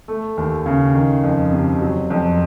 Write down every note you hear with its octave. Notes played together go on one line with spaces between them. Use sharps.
A3
D#2
C#3
D#3
F2
C3
F#3
F2